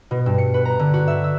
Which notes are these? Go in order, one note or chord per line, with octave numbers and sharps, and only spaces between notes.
B2
G2
C#7
B4
A#5
D3
F#4
E5
E6